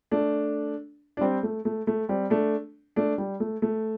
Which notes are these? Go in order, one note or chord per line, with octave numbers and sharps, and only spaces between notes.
A3 D4
D4
G3 C4
A3
A3
A3
G3 C4
A3 D4
A3 D4
G3
A3
A3